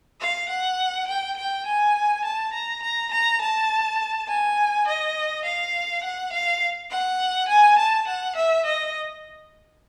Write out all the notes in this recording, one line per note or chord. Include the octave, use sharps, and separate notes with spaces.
F5
F#5
G5
G5
G#5
A5
A#5
A#5
A#5
A5
G#5
D#5
F5
F#5
F5
F#5
G#5
A5
F#5
E5
D#5